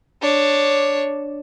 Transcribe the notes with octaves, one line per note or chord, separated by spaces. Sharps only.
D4 C#5